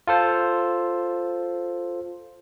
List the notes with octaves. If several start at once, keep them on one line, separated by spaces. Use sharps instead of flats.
F4 A4 C5